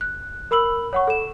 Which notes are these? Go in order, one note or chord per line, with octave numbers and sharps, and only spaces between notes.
F#6
A#4 B5 E6 F#7
C#5 F#5 C#6
A4 E7